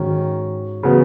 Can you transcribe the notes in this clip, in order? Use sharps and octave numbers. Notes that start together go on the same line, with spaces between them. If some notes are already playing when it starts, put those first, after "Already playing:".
Already playing: G#2 D#3 F#3 C#4
C#3 E3 F#3 B3